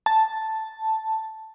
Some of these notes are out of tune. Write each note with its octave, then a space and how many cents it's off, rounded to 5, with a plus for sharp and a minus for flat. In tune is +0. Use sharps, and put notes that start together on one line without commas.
A5 +0